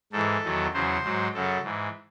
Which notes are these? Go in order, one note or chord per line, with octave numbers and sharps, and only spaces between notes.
G#2 E3 A4
E2 D#3 F#3
E2 C#3 F#3 C5
G#2 F#3
F#2 C#3 F#3 A4
G#2 E3